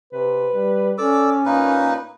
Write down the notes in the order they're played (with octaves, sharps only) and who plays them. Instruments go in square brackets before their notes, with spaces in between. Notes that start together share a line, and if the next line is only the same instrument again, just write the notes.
[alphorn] C3 [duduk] B4
[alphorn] G3
[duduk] C#4 [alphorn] A4 [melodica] D5 D6 E6
[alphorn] A#2 [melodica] A#3 D#4 B4